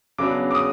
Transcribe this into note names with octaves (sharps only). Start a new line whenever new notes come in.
C#3 F#3 B3 D4 D6
D6
D#6